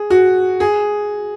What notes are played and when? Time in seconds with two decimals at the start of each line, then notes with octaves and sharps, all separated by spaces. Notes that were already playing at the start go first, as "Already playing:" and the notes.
Already playing: G#4
0.10 F#4
0.60 G#4